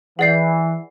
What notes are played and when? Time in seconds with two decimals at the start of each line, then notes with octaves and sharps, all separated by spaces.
0.19 E3 G#4 D5 F#5 G6 C7